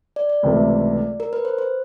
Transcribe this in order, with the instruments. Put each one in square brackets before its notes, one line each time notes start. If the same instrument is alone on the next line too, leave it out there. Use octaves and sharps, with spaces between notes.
[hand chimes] D5
D5
[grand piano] C#2 C3 E3 A3
[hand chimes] A#4
B4
C5
C5